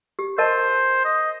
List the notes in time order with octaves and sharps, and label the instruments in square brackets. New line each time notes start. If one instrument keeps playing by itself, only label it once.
[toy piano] G4
[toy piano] A#4 D#5 A5 [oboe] C5
[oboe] D#5